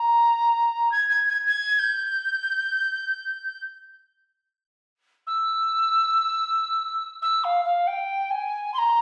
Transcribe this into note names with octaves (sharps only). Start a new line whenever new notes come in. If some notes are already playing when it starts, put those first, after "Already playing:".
Already playing: A#5
G#6
G#6
G#6
G#6
G6
E6
E6
F5
F5
G5
G#5
C6
A#5